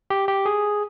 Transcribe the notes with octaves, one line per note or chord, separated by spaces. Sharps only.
G4
G4
G#4